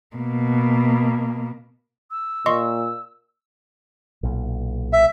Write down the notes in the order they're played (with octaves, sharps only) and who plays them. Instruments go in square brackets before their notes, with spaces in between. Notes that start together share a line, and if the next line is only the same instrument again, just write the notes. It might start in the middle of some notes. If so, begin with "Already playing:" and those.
[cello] B2 A#3
[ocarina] E6
[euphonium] A#2 [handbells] D#5 C6 C#6
[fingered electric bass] B1 A#2
[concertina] E5